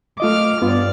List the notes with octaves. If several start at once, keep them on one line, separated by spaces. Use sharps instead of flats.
A3 F4 D#5 D6 F6
G2 B3 F4 D5